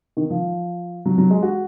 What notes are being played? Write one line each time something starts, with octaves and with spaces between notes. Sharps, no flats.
D#3
F3
F#3
F#3
G#3
F#4